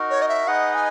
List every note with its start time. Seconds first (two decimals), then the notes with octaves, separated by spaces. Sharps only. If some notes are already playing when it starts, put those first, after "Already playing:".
Already playing: D#4 F#4 A#4
0.10 C#5
0.22 D#5
0.29 E5
0.47 D#4 G#4 B4 D#5 F#5
0.75 G#5